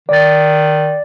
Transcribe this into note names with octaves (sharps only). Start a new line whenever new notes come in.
D#3 D5 A6